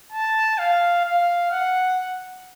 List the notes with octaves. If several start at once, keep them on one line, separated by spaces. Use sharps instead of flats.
A5
F5
F5
F#5